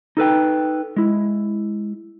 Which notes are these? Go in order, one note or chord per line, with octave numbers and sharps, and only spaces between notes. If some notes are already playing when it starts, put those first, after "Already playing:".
D#4 A4 B4 G5
G#3 E4